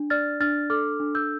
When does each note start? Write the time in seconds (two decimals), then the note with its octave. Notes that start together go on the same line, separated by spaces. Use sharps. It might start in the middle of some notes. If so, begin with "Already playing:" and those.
Already playing: D4
0.10 D5 F6 A6
0.41 D4 F6 A6
0.70 A4 D6 F6
1.00 D4
1.15 E6 G6